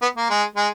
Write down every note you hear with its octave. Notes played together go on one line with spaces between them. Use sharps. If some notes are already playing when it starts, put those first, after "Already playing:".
B3
A#3
G#3
G#3